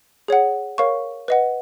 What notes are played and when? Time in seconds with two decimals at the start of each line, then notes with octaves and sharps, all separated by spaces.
0.28 G#4 C#5 F#5
0.78 A#4 C#5 F5 C#6
1.28 B4 D#5 F#5